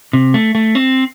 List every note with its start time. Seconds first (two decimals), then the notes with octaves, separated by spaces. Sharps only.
0.13 C3
0.34 A3
0.55 A3
0.75 C4